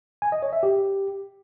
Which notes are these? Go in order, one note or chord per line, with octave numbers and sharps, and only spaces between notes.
G#5
D#5
C#5
E5
G4